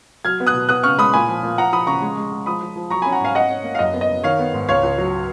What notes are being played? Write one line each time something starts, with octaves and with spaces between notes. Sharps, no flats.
F#3 F6 G#6
B3
D#6 F#6
B2
B3 D#6 F#6
C#3 C#6 F6
G#3 B5 D#6
A#2 G#5 B5
F3
A#2
F3 F#5 A#5
F3 B5 D#6
C#3 A#5 C#6
G#3
G#3
G#3
F3 B5 D#6
F3
F3
F#3 A#5 C#6
C#4 G#5 B5
F#5 A#5
G#2 F5 G#5
C#4 D#5 F#5
C#4
A#3
F5
F#2 D#5
B3
D#5
F#2
D#3 C#5 F5
B3
G#2
C#2 C#5 F5
C#2
F#3